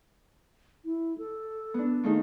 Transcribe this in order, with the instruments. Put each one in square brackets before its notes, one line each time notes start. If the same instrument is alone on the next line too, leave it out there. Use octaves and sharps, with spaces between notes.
[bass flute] E4
A4
[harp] B3 D4
[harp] D#2 A3 D#4 [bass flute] G#4